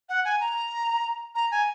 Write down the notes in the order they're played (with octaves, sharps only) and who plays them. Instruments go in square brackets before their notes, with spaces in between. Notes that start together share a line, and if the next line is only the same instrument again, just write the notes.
[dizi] F#5
G#5
A#5
A#5
G#5